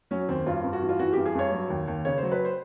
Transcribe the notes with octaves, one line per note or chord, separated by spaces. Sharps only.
F#3 C#4
D#2 C4
G2 F4
G2
F#4
E3
F4
E3 F#4
G2 G4
G#4
G2 C#5
F#3
D#2
D#2
C#3 C#5
F#3 C5
B4
C5